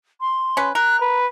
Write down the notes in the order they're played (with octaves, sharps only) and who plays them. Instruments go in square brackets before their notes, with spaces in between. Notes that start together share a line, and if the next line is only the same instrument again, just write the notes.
[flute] C6
[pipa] C#4 B4
[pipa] A#4 [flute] F#6
[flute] B4